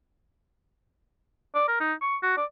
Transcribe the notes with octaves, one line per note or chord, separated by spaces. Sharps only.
D5
A#4
D#4
C#6
F#4
D5